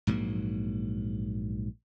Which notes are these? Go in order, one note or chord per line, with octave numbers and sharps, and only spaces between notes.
A#1 G#2 F#3 A#3